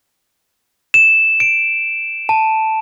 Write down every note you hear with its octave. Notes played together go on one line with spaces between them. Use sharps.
E7
D7
A5